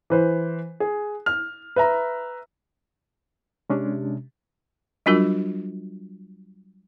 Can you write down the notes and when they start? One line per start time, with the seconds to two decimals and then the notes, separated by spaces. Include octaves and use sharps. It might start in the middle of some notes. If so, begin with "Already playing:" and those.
0.10 E3 B4 C5
0.80 G#4
1.26 F6
1.76 B4 E5 A#5
3.70 C3 G#3 C#4 D4
5.06 F#3 G3 D4 F4 F#4 A#4